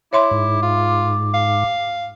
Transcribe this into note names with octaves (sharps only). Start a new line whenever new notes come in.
E4 C#5 E5 C6 D6
G#2
F4
F5